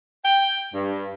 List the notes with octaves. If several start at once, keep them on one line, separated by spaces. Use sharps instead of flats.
G5
G2